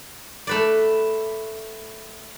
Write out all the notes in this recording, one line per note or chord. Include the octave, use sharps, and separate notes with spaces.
A3 B4 D5